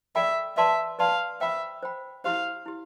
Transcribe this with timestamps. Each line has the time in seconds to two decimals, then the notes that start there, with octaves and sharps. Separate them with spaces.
0.15 A4 D5 E5 G5 B5
0.57 B4 D5 E5 A5 C6
0.99 B4 D5 F5 A5 C6
1.40 C5 E5 G5 B5
1.83 C5 G5 B5
2.24 E4 G4 C5 F5
2.66 E4 G4